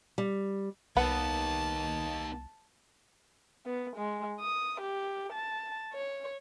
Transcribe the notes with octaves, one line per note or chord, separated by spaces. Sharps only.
G3
C2 A#3 B3 D#4 F#5 A5 B5
B3
G#3
D#6
G4
A5
C#5